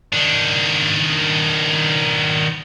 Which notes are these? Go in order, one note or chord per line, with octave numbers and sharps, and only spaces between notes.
D#3 D4